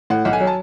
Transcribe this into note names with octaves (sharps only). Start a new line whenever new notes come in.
A2 F#5
B1 F#5
G#5
F#3
A5